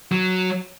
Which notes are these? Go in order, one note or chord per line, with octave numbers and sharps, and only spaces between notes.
F#3